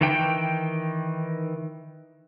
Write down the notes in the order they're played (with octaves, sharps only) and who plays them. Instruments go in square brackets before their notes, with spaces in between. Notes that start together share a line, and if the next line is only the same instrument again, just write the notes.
[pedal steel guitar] D#3 E3 G5